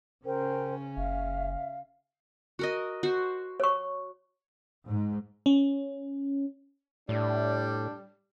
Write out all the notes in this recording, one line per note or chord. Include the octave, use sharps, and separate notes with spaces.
C#3 C#4 A#4 C5 G5
F#1 E5 F5
F#4 A#4 D#5
F#4 C5
C#5 C#6
G#2
C#4
A2 G3 D4